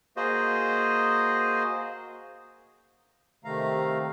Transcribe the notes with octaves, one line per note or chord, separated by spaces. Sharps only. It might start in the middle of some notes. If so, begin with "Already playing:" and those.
A#3 F#4 G#4 C5 D#5
C3 D#3 A3 F5 A#5